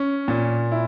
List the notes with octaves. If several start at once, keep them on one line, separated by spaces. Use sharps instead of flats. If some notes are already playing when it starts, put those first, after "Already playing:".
Already playing: C#4
A#2
E4